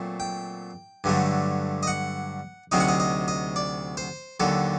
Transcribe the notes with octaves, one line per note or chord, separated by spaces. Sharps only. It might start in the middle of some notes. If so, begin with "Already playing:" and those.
Already playing: A#2 F#3 A3 C4
G5
G2 D3 F#3 A3
D#5
F#5
D2 C3 F#3 C4 D#4 D#5
F#5
D#5
D#5
D#5
D5
C5
D#2 D3 F#3 A4